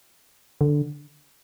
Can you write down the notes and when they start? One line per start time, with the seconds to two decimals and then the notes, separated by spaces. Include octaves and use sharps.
0.61 D3